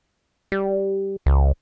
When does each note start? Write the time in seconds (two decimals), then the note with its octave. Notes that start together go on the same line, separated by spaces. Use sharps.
0.52 G3
1.26 C#2